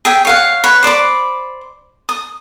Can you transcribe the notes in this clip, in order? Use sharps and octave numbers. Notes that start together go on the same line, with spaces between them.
G#4 E5 G5
C#5 F5 F#5
B4 C#5
C5 D5 B5 D6
D#6